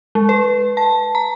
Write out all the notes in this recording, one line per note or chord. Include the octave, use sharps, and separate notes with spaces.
G#3
B4
A5
A#5